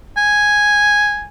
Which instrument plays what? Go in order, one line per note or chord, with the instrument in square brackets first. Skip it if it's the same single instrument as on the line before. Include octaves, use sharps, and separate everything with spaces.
[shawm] G#5